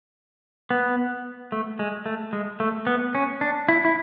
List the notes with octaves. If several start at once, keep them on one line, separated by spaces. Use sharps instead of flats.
B3
A3
G#3
A3
G#3
A3
B3
C#4
D4
E4
E4